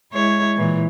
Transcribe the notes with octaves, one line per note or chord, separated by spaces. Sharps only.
G#3 E4 C#5
A#2 E3